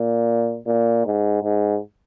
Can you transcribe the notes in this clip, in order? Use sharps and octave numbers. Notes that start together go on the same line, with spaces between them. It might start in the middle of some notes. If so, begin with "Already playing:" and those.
Already playing: A#2
A#2
G#2
G#2